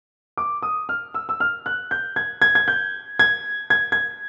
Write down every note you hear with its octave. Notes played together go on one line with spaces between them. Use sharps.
D6
D#6
F6
E6
E6
F6
F#6
G6
G#6
G#6
G#6
G6
G#6
G#6
G#6